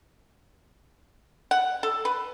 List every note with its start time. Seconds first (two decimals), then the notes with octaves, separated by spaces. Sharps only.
1.51 F#5
1.83 A4
2.05 B4